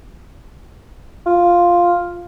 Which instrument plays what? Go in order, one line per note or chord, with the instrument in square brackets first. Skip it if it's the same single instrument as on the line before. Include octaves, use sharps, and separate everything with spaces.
[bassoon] F4